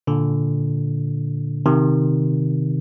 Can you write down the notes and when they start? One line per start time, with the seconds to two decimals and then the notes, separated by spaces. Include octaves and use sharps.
0.07 A#2 D3
1.66 C3 D#3